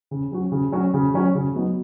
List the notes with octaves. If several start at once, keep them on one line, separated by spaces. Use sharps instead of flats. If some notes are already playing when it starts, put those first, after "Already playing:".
C#3
F#3 C#4 F#4
C#3
F#3 C#4 F#4
C#3
F#3 C#4 F#4
C#3
F#3 B3 D#4 F#4